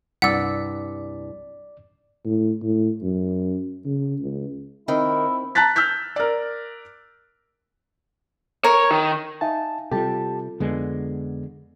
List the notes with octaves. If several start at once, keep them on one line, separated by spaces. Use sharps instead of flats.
C2 G2 D5 F#5 E6 B6
A2
A2
F#2
C#3
C#2
D#3 C4 E4
A5 A#5 F#6 A6 B6
E6 F6 G6 B6
A#4 D5
A#4 C#5
D#3
D#4 E5 F5 G#5 A5
C3 G3 F4 G4 A4 A5
F2 D3 G#3 B3